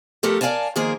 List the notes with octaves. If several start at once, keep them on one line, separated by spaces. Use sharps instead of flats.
F3 A3 G4 A4 A#4
A#4 D5 F5 G#5 A5
D#3 F3 A#3 G#4 A#4 C5